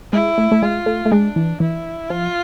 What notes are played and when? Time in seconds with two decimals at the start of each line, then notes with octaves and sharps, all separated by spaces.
0.12 G#3 E4
0.38 A3
0.52 A3
0.62 G#3 F4
0.86 A3
1.06 A3
1.12 G#3 D4
1.36 E3
1.60 E3 E4
2.10 F3 F4